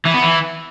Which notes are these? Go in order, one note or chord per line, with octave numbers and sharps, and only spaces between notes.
E3
B3
E3